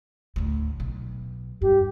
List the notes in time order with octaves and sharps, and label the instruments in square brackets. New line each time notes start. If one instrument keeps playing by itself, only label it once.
[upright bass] D2 A2
B1
[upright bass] G2 [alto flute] G4